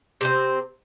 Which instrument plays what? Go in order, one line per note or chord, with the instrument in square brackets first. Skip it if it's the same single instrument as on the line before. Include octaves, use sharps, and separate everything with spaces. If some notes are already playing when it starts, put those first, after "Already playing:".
[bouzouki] C3 C4 C5